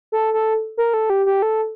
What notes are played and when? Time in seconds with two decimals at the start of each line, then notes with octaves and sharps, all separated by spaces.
0.12 A4
0.34 A4
0.77 A#4
0.94 A4
1.10 G4
1.26 G4
1.42 A4